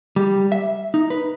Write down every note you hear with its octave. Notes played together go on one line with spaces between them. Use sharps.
G3
E5
D#4
B4